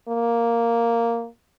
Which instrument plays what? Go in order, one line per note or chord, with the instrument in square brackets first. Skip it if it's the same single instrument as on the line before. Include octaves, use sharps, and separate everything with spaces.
[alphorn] A#3